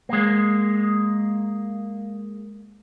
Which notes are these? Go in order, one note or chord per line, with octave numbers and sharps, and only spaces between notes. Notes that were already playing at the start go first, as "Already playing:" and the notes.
G#3 A#3